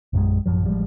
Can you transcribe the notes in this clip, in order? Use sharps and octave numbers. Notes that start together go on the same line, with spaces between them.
A#1 F#2 C#3 G#3
A1 F#2 F3 F#3
A1 F3 G3 G#3